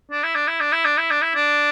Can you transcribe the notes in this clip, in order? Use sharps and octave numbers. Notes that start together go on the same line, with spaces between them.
D4
E4
D4
E4
D4
E4
D4
E4
D4
E4
D4